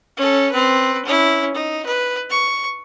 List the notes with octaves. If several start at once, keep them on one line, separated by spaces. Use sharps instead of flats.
C#4 A4
C4 B4
C#4 E4
D#4
B4
C#6